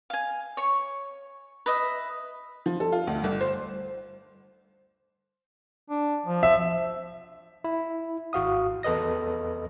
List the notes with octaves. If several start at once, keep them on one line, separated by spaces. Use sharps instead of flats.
F5 G#5
C#5 C#6
B4 D#5 E5
F3
A4
F4
D2
G1
C5
D4
F3
E5
E4
G#1 F#4 F5 D#6
E2 A4 B4 D#5 A#6